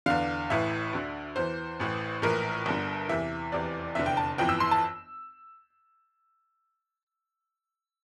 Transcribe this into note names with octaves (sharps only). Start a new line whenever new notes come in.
E2 D3 F5
A1 A2 E3 E5
D2 D3
E2 E3 C5
A1 A2 E3
A#1 A2 E3 A#4
G1 G2 D3
E2 C3 E3 E5
F1 E2 C3 E3 D5
F1 E2 D3 E5
G5
A5
G1 F2 E3 G5
E6
C6
A5